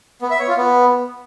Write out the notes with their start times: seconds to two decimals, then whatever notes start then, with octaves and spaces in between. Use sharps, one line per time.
0.22 B3
0.31 E5
0.39 C#5
0.48 F4
0.57 B3